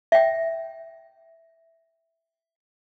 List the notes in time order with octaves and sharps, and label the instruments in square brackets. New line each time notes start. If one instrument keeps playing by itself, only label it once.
[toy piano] E5 G5